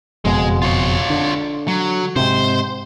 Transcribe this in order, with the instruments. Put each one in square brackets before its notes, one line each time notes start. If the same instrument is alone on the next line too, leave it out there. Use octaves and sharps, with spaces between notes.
[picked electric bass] F#1 F2 B2 [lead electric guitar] G#3
[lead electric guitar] F4 C#5
[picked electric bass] D3
[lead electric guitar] F#3
[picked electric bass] G#2 C3 [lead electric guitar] C5